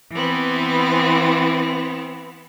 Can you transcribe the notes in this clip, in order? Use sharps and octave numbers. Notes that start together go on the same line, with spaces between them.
E3 B3 C4